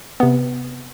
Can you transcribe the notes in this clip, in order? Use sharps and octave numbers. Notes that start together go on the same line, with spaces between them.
C3 B3